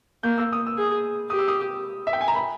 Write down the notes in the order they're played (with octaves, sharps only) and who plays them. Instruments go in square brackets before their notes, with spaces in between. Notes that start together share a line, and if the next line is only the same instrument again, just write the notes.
[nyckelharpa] A#3 [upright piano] G6
[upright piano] E6
D#6
E6
[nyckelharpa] G#4
[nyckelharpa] G4 [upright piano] D#6
[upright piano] E6
D#6
E5
G5
G#5
A#5
B5